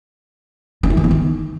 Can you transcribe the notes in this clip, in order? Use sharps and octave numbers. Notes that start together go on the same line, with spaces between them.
C#4
E4
D#3
B3
D#3